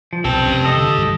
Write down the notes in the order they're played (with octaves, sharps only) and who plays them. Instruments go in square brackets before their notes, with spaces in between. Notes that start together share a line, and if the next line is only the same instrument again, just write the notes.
[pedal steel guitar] F3
[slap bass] B1 [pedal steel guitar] C4 [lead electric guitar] G4 A5
[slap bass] F1 G#2 C#4
[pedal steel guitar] A4 D#5
[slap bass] D3
G2 D3 D#3